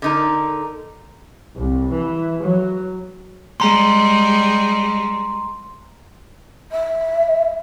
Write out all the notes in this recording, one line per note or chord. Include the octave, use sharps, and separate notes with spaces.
D3 D#4 A#4
C2
E3
F#3
G3 G#3 A#5 C6
E5